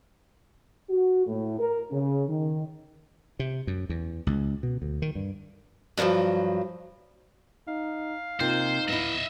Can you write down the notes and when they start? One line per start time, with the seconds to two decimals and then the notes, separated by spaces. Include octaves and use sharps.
0.90 F#4
1.27 A2
1.59 A#4
1.92 C#3
2.29 D#3
3.39 C3
3.67 F#2
3.89 E2
4.27 C#2
4.63 B2
4.82 D2
5.02 D#3
5.15 G2
5.97 G2 C3 D#3 F3 F#3
7.68 D#4 F5
8.40 C3 A#3 D#4 F4 C5
8.88 B3 E4 D#5 E5